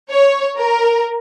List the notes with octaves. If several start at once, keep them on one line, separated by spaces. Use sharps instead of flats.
C#5
A#4